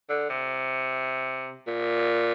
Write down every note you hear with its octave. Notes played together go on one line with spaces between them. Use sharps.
D3
C3
A#2